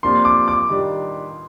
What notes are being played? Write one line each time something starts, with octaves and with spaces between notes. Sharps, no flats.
C3 F3 A#3 D4 F4 C6
D6
D6
D#3 G3 D4